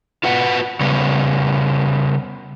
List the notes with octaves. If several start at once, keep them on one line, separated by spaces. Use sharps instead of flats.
F4 F#4 B4 F#5
C#3 G3 B3